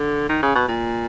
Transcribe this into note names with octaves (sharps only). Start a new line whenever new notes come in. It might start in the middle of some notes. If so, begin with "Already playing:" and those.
Already playing: D3
D#3
C#3
B2
A#2